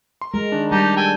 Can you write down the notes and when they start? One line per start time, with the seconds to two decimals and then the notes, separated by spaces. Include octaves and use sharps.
0.21 C6
0.34 G#3 A#4
0.52 D#3 D4
0.72 G3 D#4 G4 A5
0.97 A4 G5 G#5